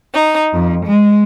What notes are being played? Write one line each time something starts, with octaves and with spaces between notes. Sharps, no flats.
D#4
F2
G#3